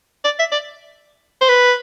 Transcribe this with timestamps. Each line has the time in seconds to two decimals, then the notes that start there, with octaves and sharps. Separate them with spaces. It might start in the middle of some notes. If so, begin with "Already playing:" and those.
0.24 D5
0.39 E5
0.52 D5
1.41 C5
1.49 B4